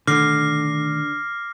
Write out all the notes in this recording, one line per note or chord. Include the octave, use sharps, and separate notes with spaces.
B2 D3 D#3 A3 D6 F6 A#6 C7